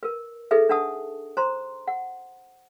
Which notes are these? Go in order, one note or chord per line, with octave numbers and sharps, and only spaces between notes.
A#4 B4
D#4 G#4 A4 B4 E5
D4 B4 F#5 A5 D#6
C5 A#5 C6
F#5